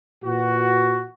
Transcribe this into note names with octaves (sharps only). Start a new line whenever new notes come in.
A#2 E3 F#4